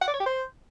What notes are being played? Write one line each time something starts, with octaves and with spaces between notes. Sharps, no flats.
F#5
D5
C#5
G4
C5